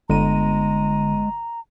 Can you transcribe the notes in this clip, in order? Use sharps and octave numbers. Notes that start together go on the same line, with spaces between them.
G1 D3 G#3 A#5 D#7